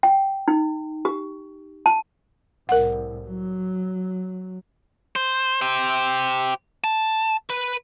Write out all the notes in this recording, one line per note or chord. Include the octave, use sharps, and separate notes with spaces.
G5
D#4
G4
A5
C2 A2 A#4 F#5
F#3
C5
G4 C5
A5
B4